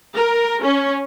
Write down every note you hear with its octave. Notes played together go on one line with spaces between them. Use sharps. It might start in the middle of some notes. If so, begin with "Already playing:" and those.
A#4
C#4